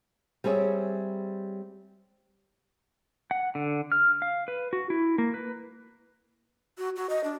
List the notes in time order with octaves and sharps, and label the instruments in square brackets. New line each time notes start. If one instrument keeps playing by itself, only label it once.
[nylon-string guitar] G3 C4 G#4 C#5 E5
[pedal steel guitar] F#5
D3
F6
F5
B4
F#4
E4
A#3
B4
[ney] F#4
F#4
D#5
D4